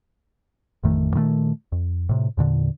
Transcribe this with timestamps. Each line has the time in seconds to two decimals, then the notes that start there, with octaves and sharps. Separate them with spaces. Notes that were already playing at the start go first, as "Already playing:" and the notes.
0.83 A1 F2 D#3 A3
1.14 A#2 D#3 G3 A3
1.72 F2
2.09 A2 C3
2.37 E2 A#2 D3